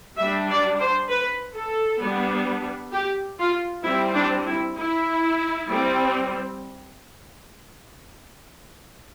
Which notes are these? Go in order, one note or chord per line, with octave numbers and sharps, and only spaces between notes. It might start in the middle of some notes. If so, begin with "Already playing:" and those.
G3 D4 E5
D5
C5
B4
A4
G3 B3 D4
G4
F4
G3 C4 E4
D4
E4
E4
G3 C4